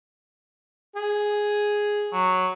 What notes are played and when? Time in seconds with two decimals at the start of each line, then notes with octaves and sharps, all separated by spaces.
0.96 G#4
2.13 F#3